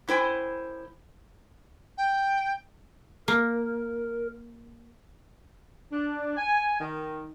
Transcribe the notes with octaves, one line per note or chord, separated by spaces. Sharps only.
F#2 E4 C5 G5 G#5
G5
A#3 A#4
D4
G#5
D#3